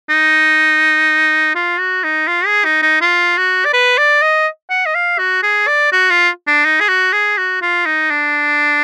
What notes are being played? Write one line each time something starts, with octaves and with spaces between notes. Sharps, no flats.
D#4
F4
F#4
D#4
F4
G#4
D#4
D#4
F4
F#4
D5
B4
D5
D#5
F#5
D#5
F5
F#4
G#4
D5
F#4
F4
D4
D#4
G#4
F#4
G#4
F#4
F4
D#4
D4